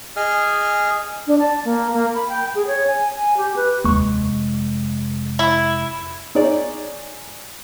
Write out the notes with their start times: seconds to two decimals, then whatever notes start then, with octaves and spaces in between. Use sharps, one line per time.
0.16 G#4 D#5 F6
1.27 D4
1.39 A5
1.65 A#3
1.93 A#3
2.15 B5
2.29 G5
2.55 G#4
2.67 C#5
2.87 G#5
3.08 G#5
3.37 G4
3.56 B4
3.84 F1 D#2 G#3 C#6
5.39 E4
6.35 D#4 G#4 C#5 D5